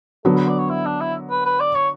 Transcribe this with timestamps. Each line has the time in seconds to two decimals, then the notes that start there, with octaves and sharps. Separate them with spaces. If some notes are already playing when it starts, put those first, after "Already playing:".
0.25 D3 F#3 B3 A4
0.36 B4
0.48 D5
0.59 C#5
0.70 E4
0.85 D4
1.00 E4
1.30 B4
1.45 B4
1.60 D5
1.75 C#5